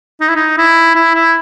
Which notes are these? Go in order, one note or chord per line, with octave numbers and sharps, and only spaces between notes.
D#4
E4
D#4
E4
E4
E4